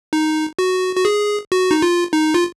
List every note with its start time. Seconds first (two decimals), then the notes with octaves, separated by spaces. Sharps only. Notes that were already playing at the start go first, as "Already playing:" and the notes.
0.13 D#4
0.59 F#4
0.96 F#4
1.05 G#4
1.52 F#4
1.71 D#4
1.82 F4
2.13 D#4
2.34 F4